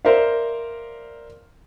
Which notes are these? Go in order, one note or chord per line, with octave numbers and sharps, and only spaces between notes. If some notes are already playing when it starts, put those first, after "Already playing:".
A#4 C5 D5 E5 F5